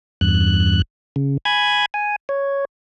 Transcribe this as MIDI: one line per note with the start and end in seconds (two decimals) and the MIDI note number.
0.21 0.82 40
0.21 0.82 43
0.21 0.82 90
1.16 1.38 49
1.45 1.86 80
1.45 1.86 83
1.45 1.86 92
1.94 2.16 80
2.29 2.65 73